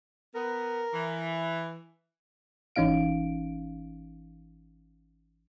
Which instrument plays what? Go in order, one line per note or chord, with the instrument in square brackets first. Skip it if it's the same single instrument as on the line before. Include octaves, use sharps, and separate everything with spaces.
[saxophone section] B3 [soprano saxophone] A#4
[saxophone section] E3
[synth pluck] G#1 E3 C#4 D#4 F5 D7